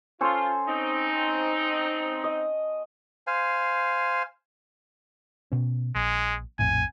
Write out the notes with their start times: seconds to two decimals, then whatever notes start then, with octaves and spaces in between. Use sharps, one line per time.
0.21 C#4 F4 A4 C5
0.68 C4 D#4
2.24 D#5
3.27 C5 F5 G#5
5.52 B2 C#4
5.95 A#1 G#3
6.59 A#1 F2 A2 G#5